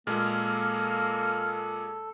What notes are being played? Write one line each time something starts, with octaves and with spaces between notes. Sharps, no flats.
A#2 G#3 A#3 A4 F6